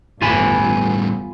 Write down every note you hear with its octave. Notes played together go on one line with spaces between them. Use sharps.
G1 E2 A2 G3 B3 F4 G#5 B5